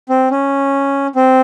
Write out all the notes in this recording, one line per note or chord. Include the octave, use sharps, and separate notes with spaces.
C4
C#4
C4